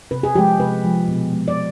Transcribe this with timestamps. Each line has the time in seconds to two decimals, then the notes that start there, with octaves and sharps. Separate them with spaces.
0.11 C3 B4
0.23 G#4
0.35 F3 G#3 G4
0.59 C3 B4
0.84 F3 G#3
1.08 B2
1.33 G#3
1.48 D5